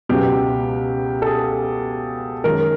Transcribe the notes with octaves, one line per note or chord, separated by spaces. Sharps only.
C#2 B2 F#3 B3 G4
A4
G#4
F#2 D#3 G#3 C#4 A#4